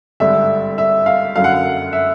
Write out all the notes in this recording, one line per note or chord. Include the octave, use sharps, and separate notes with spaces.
G#1 G2 D3 E5
E5
F5
F#2 D3 F#3 F5
F#5
F5
E5